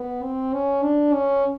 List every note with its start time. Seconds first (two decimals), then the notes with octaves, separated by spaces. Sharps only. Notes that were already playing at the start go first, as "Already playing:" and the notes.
Already playing: B3
0.23 C4
0.53 C#4
0.83 D4
1.13 C#4